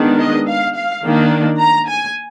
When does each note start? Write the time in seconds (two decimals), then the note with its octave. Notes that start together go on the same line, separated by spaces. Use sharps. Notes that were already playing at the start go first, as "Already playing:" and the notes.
Already playing: D#3 G#3 B3 D4
0.19 D#5
0.48 F5
0.75 F5
1.04 D#3 A#3 D4
1.59 A#5
1.88 G#5